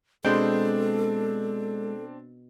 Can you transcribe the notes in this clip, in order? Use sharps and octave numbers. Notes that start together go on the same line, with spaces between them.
B2 G#3 C4 D4 A4 C5 G5